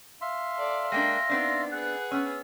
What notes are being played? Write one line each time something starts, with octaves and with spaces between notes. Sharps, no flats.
E5 F5 C6
A4 D5
G#3 A#3 D4 G5 A#6
B3 C4 D4 D#4 D5
G#4 B4 F#5 F#6
B3 C#4 E6